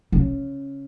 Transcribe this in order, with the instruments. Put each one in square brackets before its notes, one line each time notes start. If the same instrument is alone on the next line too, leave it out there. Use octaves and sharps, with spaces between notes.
[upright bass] C#3